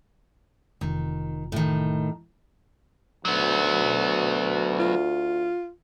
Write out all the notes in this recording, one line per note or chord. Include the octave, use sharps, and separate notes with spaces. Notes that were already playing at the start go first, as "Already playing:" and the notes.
F1 D#3 F4
A2 D#3
D2 F#3 B3
F4